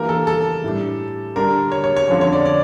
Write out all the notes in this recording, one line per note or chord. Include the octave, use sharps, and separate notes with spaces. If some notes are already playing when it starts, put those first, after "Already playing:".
Already playing: E3 A#3 D4 G4 A#4
A4
A4
A2 G3 D4
D3 G3 D4 A#4
C#5
C#5
C#5
F2 D3 F3 C#4
C#5
D5
D5